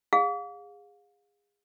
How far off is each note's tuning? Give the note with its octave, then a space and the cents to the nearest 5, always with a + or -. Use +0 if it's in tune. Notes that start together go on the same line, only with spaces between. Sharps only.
G#4 -25 F5 +35